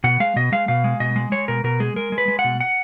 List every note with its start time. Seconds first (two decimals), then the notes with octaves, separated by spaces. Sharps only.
0.04 B2 F#5
0.20 G#3 F5
0.36 B2 D#5
0.52 G#3 F5
0.68 B2 F5
0.84 G#3
1.00 B2 D#5
1.16 G#3
1.32 G#3 C#5
1.48 B2 A#4
1.64 B2 A#4
1.80 G#3 G#4
1.96 G#3 A#4
2.12 G#3
2.18 B4
2.28 G#3
2.39 F#5
2.44 B2
2.60 F#5